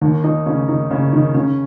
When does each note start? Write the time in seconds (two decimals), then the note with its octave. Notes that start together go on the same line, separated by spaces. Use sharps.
0.01 D#2 D#3
0.24 D#3 D#4
0.46 C#3 C#4
0.68 D#3 D#4
0.91 C#3 C#4
1.12 D#3 D#4
1.34 C#3 C#4